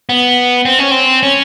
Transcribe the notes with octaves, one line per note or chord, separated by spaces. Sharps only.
B3
C4
C#4
C4
C#4